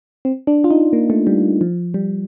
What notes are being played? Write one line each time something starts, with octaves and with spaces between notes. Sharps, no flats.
C4
D4
F4
D#4
A#3
A3
G3
F3
G3